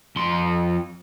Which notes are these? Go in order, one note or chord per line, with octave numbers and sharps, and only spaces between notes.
F2 C6